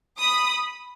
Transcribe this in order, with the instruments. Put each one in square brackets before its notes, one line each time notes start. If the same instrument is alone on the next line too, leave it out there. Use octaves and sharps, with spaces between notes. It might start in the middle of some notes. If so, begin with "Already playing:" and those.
[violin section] B5 D#6